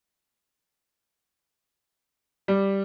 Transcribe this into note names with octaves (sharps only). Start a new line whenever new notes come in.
G3